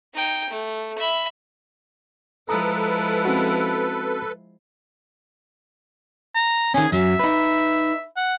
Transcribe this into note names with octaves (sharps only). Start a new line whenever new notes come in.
D#4 G5
A3
E5 B5
F3 G#3 E4 A4 B4 A#5 D#6
C4 C#4 F#4
A#5
D#3 C#4 G#4
F#2 F#3 E5
D#4 B4
F#5